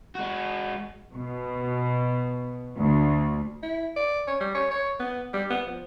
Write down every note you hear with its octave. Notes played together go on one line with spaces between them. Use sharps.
G#3 F#4
B2
D2
E4
D5
C#5
G3
C#5
C#5
B3
G3
B3
F3